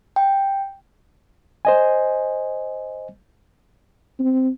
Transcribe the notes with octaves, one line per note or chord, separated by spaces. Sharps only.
G5
C5 D#5 G#5
C4